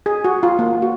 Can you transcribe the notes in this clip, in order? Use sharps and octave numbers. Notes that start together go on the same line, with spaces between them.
G#4
F#4
F4
A#3
F#4